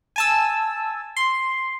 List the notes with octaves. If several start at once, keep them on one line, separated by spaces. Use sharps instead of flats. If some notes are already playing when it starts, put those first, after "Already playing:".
G#5 A5 E6
C6